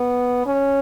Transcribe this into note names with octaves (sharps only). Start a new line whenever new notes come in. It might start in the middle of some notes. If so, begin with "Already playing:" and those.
Already playing: B3
C#4